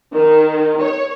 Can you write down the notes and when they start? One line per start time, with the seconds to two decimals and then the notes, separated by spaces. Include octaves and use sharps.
0.14 D#3
0.83 C#5